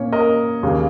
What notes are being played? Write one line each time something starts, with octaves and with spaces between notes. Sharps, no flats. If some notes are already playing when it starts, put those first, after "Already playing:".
Already playing: A#2 A#3 C#4 C#5
A#4 D#5
D#2 C#3 A#3